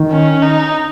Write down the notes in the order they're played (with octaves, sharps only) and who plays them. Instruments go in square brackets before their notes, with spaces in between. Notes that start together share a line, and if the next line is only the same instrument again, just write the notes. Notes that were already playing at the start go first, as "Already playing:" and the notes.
Already playing: [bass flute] D#3
[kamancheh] C#4
D#4